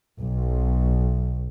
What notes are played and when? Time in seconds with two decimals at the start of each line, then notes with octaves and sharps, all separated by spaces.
0.20 B1